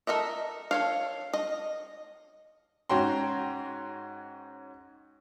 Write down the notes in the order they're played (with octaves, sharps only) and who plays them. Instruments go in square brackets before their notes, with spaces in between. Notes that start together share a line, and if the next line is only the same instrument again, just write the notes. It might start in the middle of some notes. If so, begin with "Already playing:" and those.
[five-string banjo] A4 A#4 D#5 E5
A4 C#5 F5
D#5
[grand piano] G#2 C#4 F#4 G5 A#5 C6